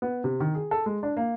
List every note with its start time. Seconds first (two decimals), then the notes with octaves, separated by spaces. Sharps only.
0.02 B3
0.24 C3
0.40 D#3
0.55 G#4
0.71 A4
0.86 G#3
1.03 D4
1.17 A#3